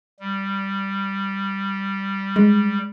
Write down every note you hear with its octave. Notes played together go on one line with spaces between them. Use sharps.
G3
G#3